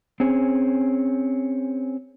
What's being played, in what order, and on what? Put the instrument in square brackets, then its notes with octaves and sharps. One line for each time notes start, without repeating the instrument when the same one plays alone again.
[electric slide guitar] C4 C#4 G#4